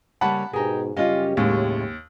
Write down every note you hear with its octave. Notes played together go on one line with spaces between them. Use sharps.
C#3 G3 A#3 F#5 A5 B5
G#2 B2 G4 G#4 A#4 G#5 A#5
F#2 C#3 G3 C#4 F4 G4 D#5 F5
D#2 A2 G#3 C#4